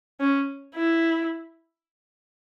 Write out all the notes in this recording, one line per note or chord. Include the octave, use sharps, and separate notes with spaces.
C#4
E4